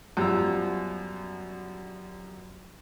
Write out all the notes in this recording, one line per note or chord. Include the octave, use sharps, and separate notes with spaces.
F#2 F3 G3 B3 A#5 E6